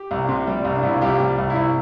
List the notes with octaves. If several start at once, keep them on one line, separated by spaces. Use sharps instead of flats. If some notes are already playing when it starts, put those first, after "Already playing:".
Already playing: G4
C2
C3
G3
C2
D4
C2 E4
F4
C2 G4
G3
C2
E4
C2